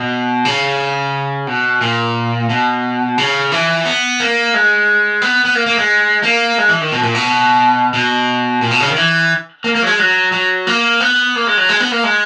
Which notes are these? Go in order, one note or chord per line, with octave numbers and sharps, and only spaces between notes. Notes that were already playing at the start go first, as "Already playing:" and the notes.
Already playing: B2
C#3
B2
A#2
B2
C#3
E3
B3
A#3
G#3
B3
B3
A#3
A#3
G#3
A#3
G#3
E3
D#3
B2
A#2
B2
B2
A#2
B2
C#3
D#3
E3
A#3
A#3
F#3
G#3
F#3
F#3
A#3
B3
A#3
G#3
F#3
G#3
B3
A#3
G#3